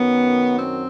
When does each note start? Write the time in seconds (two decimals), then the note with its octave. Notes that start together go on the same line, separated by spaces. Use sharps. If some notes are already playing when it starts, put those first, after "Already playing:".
Already playing: F#2 D#3 F#3 B3
0.57 C4